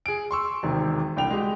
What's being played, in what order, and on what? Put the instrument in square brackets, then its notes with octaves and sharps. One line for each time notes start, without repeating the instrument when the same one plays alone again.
[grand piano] G#4 D7
C6 C#6 E6
E1 D#2 C3 D#3
C2 D3 G5 F7
G#3 F#4 G4